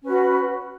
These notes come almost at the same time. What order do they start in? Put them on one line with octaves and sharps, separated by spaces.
C#4 B4 F#4